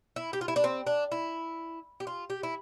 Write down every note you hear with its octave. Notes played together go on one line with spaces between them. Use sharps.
E4
G4
F4
E4
D4
C4
D4
E4
G4
F4
G4
E4